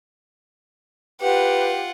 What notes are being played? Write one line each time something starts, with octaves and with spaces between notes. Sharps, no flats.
F4 G4 B4 F#5